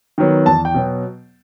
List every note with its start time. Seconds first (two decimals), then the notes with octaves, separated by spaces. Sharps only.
0.18 D#3 F#3 B3
0.46 E2 A5
0.65 G5
0.74 B2 F#3 B3